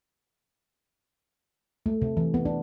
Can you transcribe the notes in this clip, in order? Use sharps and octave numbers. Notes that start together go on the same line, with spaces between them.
A3
C3
E3
B3
D4